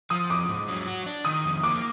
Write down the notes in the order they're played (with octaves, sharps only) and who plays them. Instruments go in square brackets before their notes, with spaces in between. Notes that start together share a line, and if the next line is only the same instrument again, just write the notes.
[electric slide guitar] F3 [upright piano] D#6
[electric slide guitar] F2 [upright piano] D6
[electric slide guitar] G#2
F#3
F#4
D4
[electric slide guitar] D#3 [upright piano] D#6
[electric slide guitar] F2
[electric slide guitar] A#3 [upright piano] D6